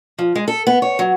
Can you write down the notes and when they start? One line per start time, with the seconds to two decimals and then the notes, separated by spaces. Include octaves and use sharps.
0.18 F3
0.35 G#3
0.48 A4
0.67 B3
0.82 C#5
0.99 F#3